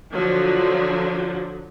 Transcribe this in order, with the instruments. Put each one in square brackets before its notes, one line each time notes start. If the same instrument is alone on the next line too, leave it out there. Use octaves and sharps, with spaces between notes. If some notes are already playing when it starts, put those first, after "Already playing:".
[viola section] D3 F3 F#3